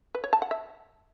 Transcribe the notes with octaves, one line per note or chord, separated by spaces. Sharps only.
B4
C#5
A5
F#5
E5